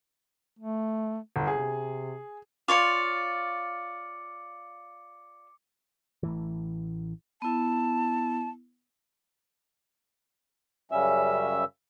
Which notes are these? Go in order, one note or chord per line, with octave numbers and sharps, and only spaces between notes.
A3
G1
C3 G#4
F4 C#5 D5 D6 C#7
A1 A2 E3
B3 E4 A5
F#2 C#3 G3 C#4 E5 E6